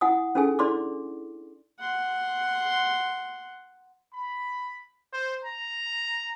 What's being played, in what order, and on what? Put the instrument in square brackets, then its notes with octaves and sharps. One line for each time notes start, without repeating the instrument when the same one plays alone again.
[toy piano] E4 F#5 G#5 D#6
C#4 D#4 G#4 A4 G#5
D4 E4 D5 C6 D6
[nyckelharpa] F#5 C6
[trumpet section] B5
C5
A#5